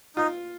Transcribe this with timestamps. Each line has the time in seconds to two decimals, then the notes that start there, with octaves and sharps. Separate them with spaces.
0.17 D#4 F4